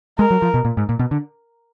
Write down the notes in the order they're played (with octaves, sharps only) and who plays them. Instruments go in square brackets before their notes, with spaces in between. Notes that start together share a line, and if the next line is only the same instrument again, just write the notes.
[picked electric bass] G#3 [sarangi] A#4
[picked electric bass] F#3
F3
B2
A#2
G#2
A#2
B2
D3